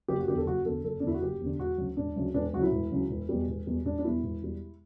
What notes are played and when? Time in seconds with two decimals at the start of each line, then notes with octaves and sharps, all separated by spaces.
0.08 F#1 G4
0.19 F#4
0.28 E2 D3 G4
0.37 A4
0.46 F#1 F#4
0.65 E2 D3 A4
0.84 F#1 A4
1.00 D4
1.03 E2 D3 E4
1.14 F#4
1.22 F#1 G4
1.40 E2
1.45 D3
1.59 E1 F#4
1.78 D2 C#3 F#3
1.97 E1 D4
2.16 D2 C#3 F#3
2.34 E1 D4
2.53 D2 C#3 F#3 F#4
2.62 E4
2.72 E1
2.91 D2 C#3 F#3
3.10 E1
3.29 E2 B2 G3
3.48 E1
3.67 E2 B2 G3
3.85 E1 D4
3.98 D4
4.04 E2 B2 G3 E4
4.23 E1
4.42 E2 B2 G3